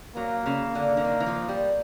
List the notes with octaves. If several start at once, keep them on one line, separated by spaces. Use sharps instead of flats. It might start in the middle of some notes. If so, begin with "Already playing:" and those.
F#3 A#3
C#3
D3
D3
D#3
E3
F3
G3